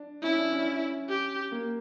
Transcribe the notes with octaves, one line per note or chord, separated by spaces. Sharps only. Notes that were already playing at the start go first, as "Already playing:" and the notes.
Already playing: D4
C#4 E4
D4
C#4
C#4
G4
A#3